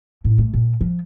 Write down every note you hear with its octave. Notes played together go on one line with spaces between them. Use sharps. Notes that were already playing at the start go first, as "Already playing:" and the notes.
A2
A3
A#2
F3